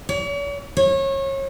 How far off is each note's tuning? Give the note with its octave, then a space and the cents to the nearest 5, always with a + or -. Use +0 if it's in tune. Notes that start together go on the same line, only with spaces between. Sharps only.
C#5 +45
C#5 -30